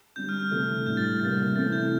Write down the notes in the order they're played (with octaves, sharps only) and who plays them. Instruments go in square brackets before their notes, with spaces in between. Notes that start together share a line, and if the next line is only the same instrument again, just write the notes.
[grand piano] D3 G3 C4 G4 [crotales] G6
[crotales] F6
F6
[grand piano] C3 E3 A3 E4 A4
[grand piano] A2 G3 D4 [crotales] G6
[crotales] A6
[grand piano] C3 G3 A#3 [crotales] A6
[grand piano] C3 E3 A3 C4 [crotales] A6
[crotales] G6